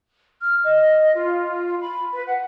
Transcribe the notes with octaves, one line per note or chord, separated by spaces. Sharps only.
F6
D#5
F4
B5
B4
F#5